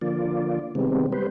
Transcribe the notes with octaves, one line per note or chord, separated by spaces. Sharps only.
D3 F3 A#3 F4 D5
C3 D#3 G3 G#3 B3 C4
G3 B4 C5